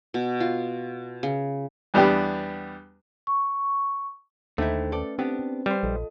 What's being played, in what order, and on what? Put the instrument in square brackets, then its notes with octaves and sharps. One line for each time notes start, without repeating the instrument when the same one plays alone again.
[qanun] B2
F4
C#3
[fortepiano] E2 G3 B3 D4 G4
[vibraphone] C#6
[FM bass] D#2 [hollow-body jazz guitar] D3 D#4 E4 [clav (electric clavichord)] A3 [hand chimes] C5 G5
[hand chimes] C#4 B4 [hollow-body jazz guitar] A4 D5
[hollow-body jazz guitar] B3 D4 G4 [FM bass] C4
[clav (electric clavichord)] G3 [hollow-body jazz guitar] B4 C5
[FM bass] A#1 [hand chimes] F4 A4 D#5